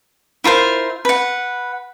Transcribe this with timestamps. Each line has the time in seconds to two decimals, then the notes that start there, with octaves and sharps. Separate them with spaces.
0.44 E4 F4 A#4 C5
1.05 B4 F#5